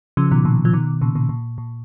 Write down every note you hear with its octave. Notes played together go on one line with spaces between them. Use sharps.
C#3 F3
B2 D#3
A#2 C#3
F3
B2 D#3
A#2 C#3
A#2 C#3
A#2
A#2